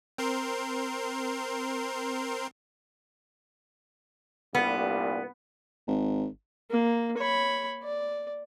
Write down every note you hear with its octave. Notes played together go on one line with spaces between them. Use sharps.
C4 A#4 C6
C2 G2 A#2 B3
G#1
A#3
C#5 B5
D5